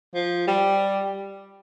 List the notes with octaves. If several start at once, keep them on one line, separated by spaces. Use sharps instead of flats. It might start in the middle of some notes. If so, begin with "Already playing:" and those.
F3
G3